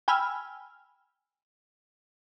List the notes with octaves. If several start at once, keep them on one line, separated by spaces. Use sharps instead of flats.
G5 G#5 B5 E6 F6